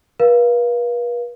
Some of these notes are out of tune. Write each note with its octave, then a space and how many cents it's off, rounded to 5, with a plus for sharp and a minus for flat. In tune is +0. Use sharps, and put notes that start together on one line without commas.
B4 -40 F5 -10